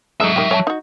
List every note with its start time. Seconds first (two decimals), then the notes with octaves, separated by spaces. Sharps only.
0.20 F#3 G#3 A3 D#4 E5
0.36 D#3 G4
0.51 C#5 G5 A5
0.67 D#4 F#4